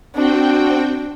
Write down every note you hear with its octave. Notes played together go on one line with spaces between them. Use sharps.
C4 D4 F#4 G5